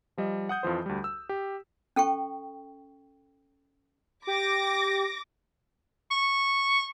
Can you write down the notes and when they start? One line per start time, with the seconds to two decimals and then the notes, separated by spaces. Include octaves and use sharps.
0.17 F3 G3 D#5
0.49 F#5 D#6 G6
0.63 F2 E3 F3 C5
0.86 D2 G3
1.04 E6
1.29 G4
1.96 C#4 A4 G5 C#6
4.27 G4 D6 A#6
6.11 C#6